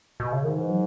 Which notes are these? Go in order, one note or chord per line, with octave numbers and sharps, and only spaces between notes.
B2
C#3
G#2 D#3
E3
F#3